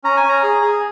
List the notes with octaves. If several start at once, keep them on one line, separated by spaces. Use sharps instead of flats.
C#4 A#5
G#5
C#4
A#5
G#4
G#4